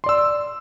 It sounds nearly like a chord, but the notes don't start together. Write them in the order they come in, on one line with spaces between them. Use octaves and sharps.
C6 D5 E6